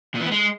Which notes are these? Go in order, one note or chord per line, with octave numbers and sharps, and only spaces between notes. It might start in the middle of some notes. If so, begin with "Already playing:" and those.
A#2
E3
B3
G#3